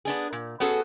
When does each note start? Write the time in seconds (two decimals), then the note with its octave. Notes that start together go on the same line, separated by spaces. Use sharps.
0.05 B3 D4 G#4
0.33 A#2
0.60 B3 C#4 F#4 G#4 A4